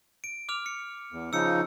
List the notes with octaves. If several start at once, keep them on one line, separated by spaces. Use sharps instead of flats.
D7
D6 F6 F7
C#7
E2
C#3 F3 D#4 E6 C#7